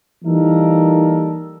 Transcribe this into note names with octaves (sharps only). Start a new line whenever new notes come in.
E3 G3 A#3 D#4 A4 A#4